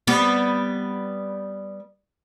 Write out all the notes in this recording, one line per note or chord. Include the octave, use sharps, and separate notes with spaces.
G3 B3